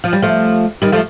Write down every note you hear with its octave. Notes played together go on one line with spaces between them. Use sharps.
F3
G3
F3 A3
D#3 G3
F3 A3